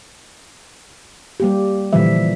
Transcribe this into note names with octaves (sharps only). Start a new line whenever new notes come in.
G3 A#3 G4
A#2 D3 E3 F3 G3 E5